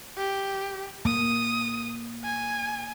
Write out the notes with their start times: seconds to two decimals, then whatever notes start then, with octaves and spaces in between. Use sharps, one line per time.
0.17 G4
1.05 A#3 D#6
2.24 G#5